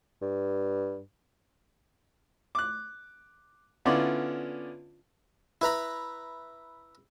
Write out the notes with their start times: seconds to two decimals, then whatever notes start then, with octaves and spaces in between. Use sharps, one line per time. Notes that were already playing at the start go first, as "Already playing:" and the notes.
0.22 G2
2.55 D6 F#6
3.85 D3 B3 C#4 E4 F4 D5
5.61 E4 B4 A#5 B5